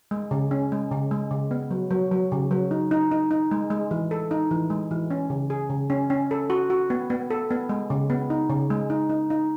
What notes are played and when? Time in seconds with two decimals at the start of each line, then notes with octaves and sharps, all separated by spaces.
0.11 G#3
0.31 C#3
0.51 C#4
0.72 G#3
0.91 C#3
1.11 G#3
1.31 C#3
1.51 B3
1.71 F#3
1.91 F#3
2.11 F#3
2.32 C#3
2.51 F#3
2.71 D#4
2.91 D#4
3.11 D#4
3.31 D#4
3.51 G#3
3.70 G#3
3.91 E3
4.11 A4
4.31 D#4
4.51 E3
4.70 G#3
4.91 E3
5.11 C#4
5.30 C#3
5.50 G#4
5.70 C#3
5.90 C#4
6.10 C#4
6.31 A4
6.50 F#4
6.70 F#4
6.90 B3
7.10 B3
7.30 A4
7.51 B3
7.69 G#3
7.90 C#3
8.10 B3
8.30 D#4
8.50 C#3
8.70 G#3
8.90 D#4
9.10 D#4
9.30 D#4